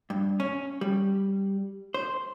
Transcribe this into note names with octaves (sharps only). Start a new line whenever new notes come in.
G2
C#4
G3
C5